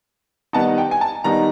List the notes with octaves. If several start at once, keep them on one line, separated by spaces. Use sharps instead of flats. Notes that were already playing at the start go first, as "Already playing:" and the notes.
D#3 G3 B3 D#4 A5
G5
G#5
A5
D#3 G3 B3 D#4 A#5